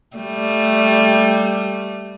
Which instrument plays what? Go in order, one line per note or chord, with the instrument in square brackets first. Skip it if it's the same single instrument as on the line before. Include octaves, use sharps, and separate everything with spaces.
[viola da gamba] G3 A3